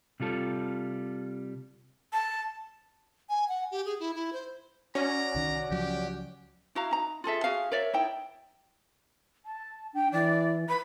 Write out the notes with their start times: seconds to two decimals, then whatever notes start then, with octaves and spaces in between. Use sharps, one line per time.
0.20 C3 G3 F4 A4
2.13 A5
3.29 G#5
3.49 F#5
3.71 G4
3.85 G#4
4.00 E4
4.15 E4
4.33 C5
4.95 C#4 F#4 D5 A#5
5.35 C2 D#3
5.71 C#2 F3 F#3 G4
6.75 E4 F#4 F5 A#5
6.91 D#4 A#5
7.24 F4 G#4 A4 E5
7.44 F#4 G#4 F5
7.72 A#4 C#5 D5 E5
7.93 D#4 E4 G5
9.45 A5
9.94 D4 G5
10.12 E3 D5
10.68 B4 B5